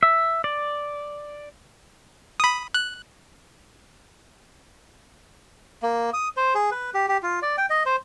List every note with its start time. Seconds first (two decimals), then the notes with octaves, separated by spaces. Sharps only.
0.03 E5
0.44 D5
2.40 B5 D#6
2.74 F#6
5.82 A#3
6.13 D#6
6.37 C5
6.55 G#4
6.72 B4
6.94 G4
7.08 G4
7.23 F4
7.42 D5
7.58 G5
7.70 D#5
7.86 C5